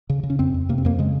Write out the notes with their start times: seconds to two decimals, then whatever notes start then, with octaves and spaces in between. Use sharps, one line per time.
0.10 C#3
0.23 C#3
0.30 C#4
0.39 F2 C4
0.54 F2
0.69 C3 A#3
0.78 C4
0.85 F2 A#3
0.99 C#3 G#3